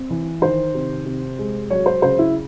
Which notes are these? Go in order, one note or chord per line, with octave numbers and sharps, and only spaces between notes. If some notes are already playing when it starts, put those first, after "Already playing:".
Already playing: C4
E3
D#3 C5
C3
C3
G#3
F#3 C#5
C5
C#3 C5
E4